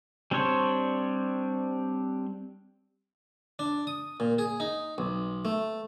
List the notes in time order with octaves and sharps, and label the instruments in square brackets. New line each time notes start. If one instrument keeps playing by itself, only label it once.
[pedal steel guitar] G3 C4 D4 C5 C#5
[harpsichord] D4
D#6
A#2
G#4
D#4
B1
A3